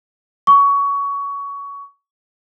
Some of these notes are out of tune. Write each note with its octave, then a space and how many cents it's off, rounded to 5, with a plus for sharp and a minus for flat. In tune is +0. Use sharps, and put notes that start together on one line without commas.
C#6 +20